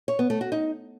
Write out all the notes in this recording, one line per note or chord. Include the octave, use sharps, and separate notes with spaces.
C#5
B3
A3
F#4
D#4